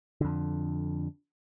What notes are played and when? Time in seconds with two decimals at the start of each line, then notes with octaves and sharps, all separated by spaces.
0.21 F2 D3